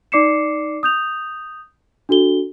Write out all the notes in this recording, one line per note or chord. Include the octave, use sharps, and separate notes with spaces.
D#4 D5 D6 C7 C#7 E7
D#6 G6 F7
D4 F#4 A4 G7